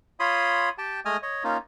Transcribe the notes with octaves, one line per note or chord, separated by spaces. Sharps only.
F4 C#5 B5 C6 D#6
G4 G5 A5
G#3 A3 D#5 G#5 D#6 F6
C#5 D#5
A#3 C#4 D#4 F4